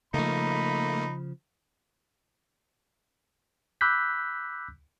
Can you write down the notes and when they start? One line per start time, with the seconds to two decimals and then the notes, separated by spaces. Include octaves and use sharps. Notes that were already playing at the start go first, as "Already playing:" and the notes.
0.14 C#3 F3 A3 A#3 D#4 B5
3.81 B5 D6 E6 F#6 G6 B6